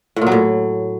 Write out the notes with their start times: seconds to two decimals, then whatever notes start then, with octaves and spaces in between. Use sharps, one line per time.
0.16 A2
0.22 A#2
0.27 F#3
0.32 A2